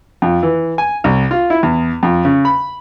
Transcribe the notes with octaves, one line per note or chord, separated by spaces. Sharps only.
F2
E3
G#5
C2
F4
E4
E2
F2
C#3
B5